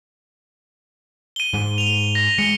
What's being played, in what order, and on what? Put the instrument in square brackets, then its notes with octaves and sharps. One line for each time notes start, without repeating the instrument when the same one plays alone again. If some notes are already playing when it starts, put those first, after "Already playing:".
[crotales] D#7 G7
[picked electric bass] G#2 G#3
[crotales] F7 G7
A#6
[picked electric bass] G#3 [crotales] C#7 G7